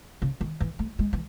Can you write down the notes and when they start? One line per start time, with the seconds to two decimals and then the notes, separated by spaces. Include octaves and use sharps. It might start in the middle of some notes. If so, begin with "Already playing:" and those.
0.22 C#3
0.41 D#3
0.60 E3
0.79 A3
0.99 G#3
1.13 E3